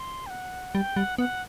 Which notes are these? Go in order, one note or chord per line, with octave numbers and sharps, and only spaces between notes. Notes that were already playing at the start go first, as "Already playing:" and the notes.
Already playing: C6
G5
F#5
G3 G5
G3 F#5
B3 F#5